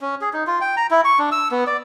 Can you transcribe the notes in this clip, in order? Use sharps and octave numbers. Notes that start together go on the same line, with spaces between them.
C#4
G#4
D#4
F4
G5
A#5
E4
C#6
D4
E6
B3
D5